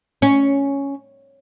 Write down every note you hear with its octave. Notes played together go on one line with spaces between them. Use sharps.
C#4